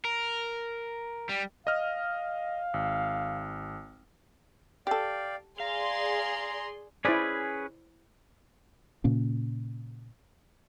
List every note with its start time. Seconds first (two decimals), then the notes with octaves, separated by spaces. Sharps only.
0.05 A#4
1.29 G3
1.67 D#5 F5 F6
2.74 G#1
4.87 G4 A4 D5 F5 G5
5.60 G#4 D5 F5 A#5 C6
7.05 C#4 E4 G#4 B4 C5 D5
9.04 A#2 C#3 A#3 C#4